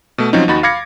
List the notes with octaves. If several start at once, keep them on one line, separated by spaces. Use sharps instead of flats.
B2 A3
F3 F#3 C4 C#4 D#4
D#2 D#4 F#4 B5 A6
F5 B5 D6 G#6 A#6 C#7